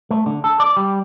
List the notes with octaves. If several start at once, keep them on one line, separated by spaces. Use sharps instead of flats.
A3
D3
A4
D5
G3